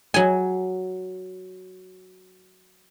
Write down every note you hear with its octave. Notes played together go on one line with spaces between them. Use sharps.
F#3 G#5